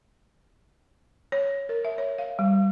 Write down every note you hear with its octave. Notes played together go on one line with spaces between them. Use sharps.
C#5
A#4
E5
C#5
F5
G3